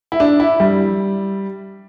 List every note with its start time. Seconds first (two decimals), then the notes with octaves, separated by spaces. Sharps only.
0.12 E4
0.20 D4
0.40 E4
0.60 G3